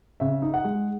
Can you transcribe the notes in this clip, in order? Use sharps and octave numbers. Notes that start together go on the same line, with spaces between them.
C#3 E5
D#4
F#5
G#3